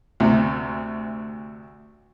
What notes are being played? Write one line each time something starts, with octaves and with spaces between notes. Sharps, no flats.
D2 C3